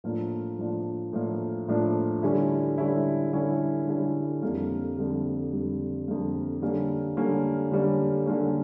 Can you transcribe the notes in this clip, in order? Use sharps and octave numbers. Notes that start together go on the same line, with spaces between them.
A2 F3 A#3 D4 F4
A2 F3 A#3 D4 F4
A2 F3 A#3 D4 F4
A2 F3 A#3 D4 F4
D3 G3 C#4 E4
D3 G3 C#4 E4
D3 G3 C#4 E4
D3 G3 C#4 E4
F2 D3 G3 A#3
F2 D3 G3 A#3
F2 D3 G3 A#3
F2 D3 G3 A#3
D3 G3 A#3 C#4
D3 G3 A#3 C#4
D3 G3 A#3 C#4
D3 G3 A#3 C#4